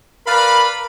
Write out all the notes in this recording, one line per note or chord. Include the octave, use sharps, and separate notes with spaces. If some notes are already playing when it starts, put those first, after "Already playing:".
A#4 B4 D5 F5 B5